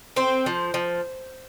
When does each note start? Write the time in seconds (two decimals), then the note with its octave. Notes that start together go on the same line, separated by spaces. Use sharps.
0.16 C4 C5
0.46 F3
0.74 F3